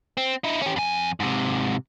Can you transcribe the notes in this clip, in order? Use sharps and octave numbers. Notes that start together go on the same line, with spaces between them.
C4
D#4 E4
C#4 G4
F2 G#5
G#2 C3